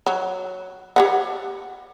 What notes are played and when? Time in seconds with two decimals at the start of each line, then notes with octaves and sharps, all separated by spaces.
0.06 F#3
0.96 G4 C#5 F#5